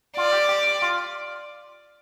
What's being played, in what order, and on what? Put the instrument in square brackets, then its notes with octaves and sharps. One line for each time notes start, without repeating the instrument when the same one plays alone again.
[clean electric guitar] F4 [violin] D5
[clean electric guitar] G4
G4
F4